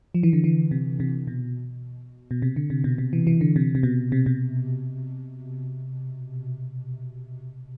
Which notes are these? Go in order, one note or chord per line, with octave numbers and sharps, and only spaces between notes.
F3
E3
D3
E3
C3
C3
B2
B2
C3
D3
C3
B2
C3
E3
E3
D3
C3
C3
B2
C3
B2